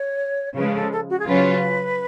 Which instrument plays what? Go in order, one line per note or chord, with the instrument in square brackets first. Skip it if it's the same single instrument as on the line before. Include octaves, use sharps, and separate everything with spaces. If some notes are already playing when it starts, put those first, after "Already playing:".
Already playing: [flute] C#5
[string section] C#3 F3 G#3 [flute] B4
[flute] A4
A4
F#4
G#4
[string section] C#3 F#3 C#4 F4 [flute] B4